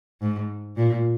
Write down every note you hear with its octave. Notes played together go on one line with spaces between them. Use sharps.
G#2
A#2